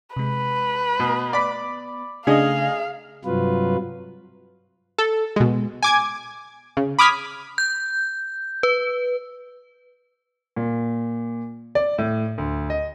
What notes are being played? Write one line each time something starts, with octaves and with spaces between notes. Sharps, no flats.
C3 G#3 B4
B2 B3
D5 B5
C#3 A3 D4 G#4 D#5 F5
G2 C3 F#3 F4 B4
A4
B2 G#3
G#5 D6 G#6
C#3
B5 D6 D#6 F6 G#6 B6
G6
B4
A#2
D5
A2
D2
D#5